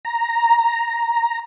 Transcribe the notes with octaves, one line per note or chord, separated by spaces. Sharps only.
A#5